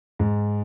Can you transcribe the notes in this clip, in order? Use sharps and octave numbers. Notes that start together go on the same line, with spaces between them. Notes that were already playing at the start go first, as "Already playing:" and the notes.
G#2